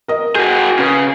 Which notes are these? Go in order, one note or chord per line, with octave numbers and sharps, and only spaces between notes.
A#4 D#5
F#4 G#4 G6
C#3 B4